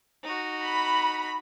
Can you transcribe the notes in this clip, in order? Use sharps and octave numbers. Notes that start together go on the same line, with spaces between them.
D#4 F#4
B5